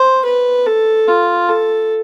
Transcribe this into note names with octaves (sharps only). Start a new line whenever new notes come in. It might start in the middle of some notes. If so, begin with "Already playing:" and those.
Already playing: C5
B4
A4
F4
A4